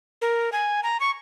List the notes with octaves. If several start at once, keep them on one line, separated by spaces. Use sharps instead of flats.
A#4
G#5
A#5
C#6